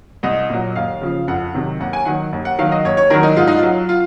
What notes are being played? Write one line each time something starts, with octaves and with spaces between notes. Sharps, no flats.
C2 D#5
A#2 F#3
D#2 F5
C#3 F3
F2 F#5
C3 D#3 F#3
D#2 F#5
G#5
D#3 F#3 F#5
D#2
F#5
D#3 F#3 F5
D#5
D#2 C#5
C#5
D#3 F#3 A#4
D#4
G#2 F4
D#4
F4
F#3
F4